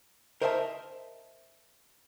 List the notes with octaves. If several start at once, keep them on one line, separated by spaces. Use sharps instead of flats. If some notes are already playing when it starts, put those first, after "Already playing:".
A#4 C5 D#5 E5 G#5 A5